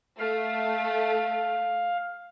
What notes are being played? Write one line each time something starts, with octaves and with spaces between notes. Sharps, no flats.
A3 F5